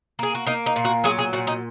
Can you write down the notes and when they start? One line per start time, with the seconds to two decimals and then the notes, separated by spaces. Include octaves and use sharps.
0.19 A#3 G#4
0.35 F#4
0.46 A#3 D#4
0.66 D#4
0.76 A#2
0.85 F#4
1.04 F#3 G#4
1.18 G#4
1.33 A#2 F#4
1.47 D#4